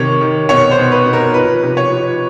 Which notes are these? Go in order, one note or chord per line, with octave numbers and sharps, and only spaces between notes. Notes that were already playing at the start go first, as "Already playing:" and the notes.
Already playing: C3 D#3 C#5
D#3
B2 C#5
C5
B2
B4
B2
A#4
F3 B4
C3
C#5
F3